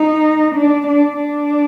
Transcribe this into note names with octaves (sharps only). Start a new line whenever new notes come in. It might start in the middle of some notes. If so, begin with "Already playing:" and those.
Already playing: D#4
D4
D4
D4